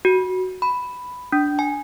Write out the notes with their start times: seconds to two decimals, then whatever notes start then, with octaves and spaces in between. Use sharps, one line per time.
0.05 F#4
0.62 B5
1.32 D4
1.59 G#5